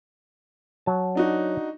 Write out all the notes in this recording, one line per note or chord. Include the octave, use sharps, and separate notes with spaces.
F#3 A5
D4 D#4 F#4